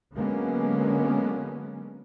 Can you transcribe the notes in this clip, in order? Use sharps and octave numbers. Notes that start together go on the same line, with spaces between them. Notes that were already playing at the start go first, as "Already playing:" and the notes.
D3 F#3 G#3 A#3 B3 C#4